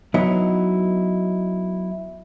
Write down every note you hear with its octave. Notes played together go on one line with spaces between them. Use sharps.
F#3 B3 D#4 E4